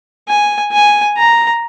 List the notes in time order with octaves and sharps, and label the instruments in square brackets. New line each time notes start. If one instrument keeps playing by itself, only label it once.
[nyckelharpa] G#5
G#5
A#5